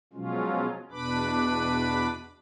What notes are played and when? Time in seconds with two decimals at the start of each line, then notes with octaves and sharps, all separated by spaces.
0.13 B2 F3 F#3 G#3 C#4 F4
0.91 E2 B2 D4 B4 B5 D6